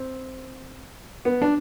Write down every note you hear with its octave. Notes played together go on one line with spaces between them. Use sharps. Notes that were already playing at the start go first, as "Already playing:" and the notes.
Already playing: C4
B3
D4